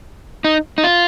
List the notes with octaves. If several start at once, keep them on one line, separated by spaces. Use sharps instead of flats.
D#4
D#4
F4